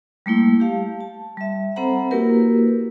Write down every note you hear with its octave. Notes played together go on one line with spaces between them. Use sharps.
G3 A3 A#3 E4
G4 F5 A5
A5
G3 E5
C4 A4 C5 F#5 A#5 B5
A#3 E4 F#4 G4 A#4 B4